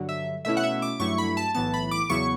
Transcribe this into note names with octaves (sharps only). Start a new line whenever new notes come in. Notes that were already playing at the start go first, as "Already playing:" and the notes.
Already playing: G2 D3 F#3
E5
B2 A3 C#4 E4 E5
F#5
E5
D6
G2 F#3 A3 E4 C#6
B5
A5
B1 A2 E3 B3 A5
B5
D6
E2 C#3 F#3 B3 E4 C#6